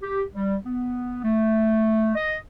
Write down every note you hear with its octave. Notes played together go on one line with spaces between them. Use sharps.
G4
G3
B3
A3
D#5